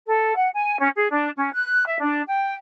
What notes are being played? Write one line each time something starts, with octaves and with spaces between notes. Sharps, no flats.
A4
F#5
G#5
C#4
G#4
D4
C#4
F#6
E5
D4
G5